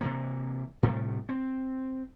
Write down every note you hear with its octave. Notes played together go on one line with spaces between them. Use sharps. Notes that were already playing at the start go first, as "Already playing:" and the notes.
C3 E3 A#3
A2 C3 G3 A3
C4